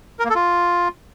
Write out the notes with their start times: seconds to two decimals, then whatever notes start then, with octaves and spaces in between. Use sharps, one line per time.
0.19 A#4
0.25 A#3
0.30 A4
0.35 F4